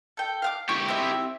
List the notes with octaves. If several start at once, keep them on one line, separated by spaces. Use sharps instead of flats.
A4 G5
F5 F#5 D6
E4 G4 C#6
C4 E5